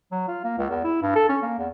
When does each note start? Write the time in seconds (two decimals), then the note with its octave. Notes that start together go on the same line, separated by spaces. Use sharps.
0.11 F#3
0.28 F4
0.44 A#3
0.58 C#2
0.70 E2
0.84 E4
1.02 G2
1.15 A4
1.29 C#4
1.42 A#3
1.59 E2